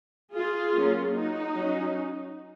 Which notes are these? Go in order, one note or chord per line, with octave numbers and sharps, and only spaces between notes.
F4 G#4
F#3 A#3 C#4
D#4 F#4
F#3 C#4